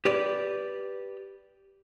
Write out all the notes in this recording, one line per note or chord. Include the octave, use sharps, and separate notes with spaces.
G4 B4 D5